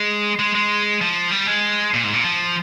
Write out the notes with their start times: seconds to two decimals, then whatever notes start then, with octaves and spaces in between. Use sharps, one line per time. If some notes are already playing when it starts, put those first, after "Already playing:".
Already playing: G#3
0.39 G#3
0.55 G#3
1.01 F3
1.31 G3
1.47 G#3
1.94 A#2
2.04 G#2
2.13 A#2
2.24 F3